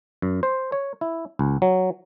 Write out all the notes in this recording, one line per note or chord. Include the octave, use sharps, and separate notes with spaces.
F#2
C5
C#5
E4
C#2
F#3